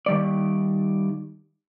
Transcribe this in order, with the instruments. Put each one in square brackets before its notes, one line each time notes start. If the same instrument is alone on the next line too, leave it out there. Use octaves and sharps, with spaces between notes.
[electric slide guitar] D#3 G3 D5